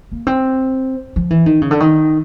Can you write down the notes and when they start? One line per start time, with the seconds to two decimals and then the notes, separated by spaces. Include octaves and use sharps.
0.12 A#3
0.27 C4
1.16 F3
1.30 E3
1.46 D#3
1.61 C#3
1.71 D3
1.80 D#3